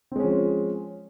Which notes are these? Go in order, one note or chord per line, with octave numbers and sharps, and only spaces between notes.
F3 G#3 C4 C#4